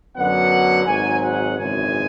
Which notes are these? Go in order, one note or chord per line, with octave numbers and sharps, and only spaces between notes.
F#2 D3 F#3 B3 F#5
G#1 G#2 F#3 G#5
F#5
G#1 F#2 C#3 E3 G#3 G#5